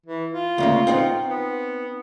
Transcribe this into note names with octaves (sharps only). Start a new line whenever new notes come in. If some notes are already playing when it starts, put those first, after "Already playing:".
E3
F4
D2 C#3 A#3
C4 D#4 F#5
B3